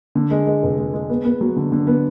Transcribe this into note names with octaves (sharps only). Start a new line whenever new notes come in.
D3
G#3
G#3
F1
G#3
G#3
B3
B3
F#3
D3
D3
B3